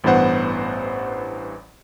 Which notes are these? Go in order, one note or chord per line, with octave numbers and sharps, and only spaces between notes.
A1 G2 E3 B3 C5 F#5